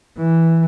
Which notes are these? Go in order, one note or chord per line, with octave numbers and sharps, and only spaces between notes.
E3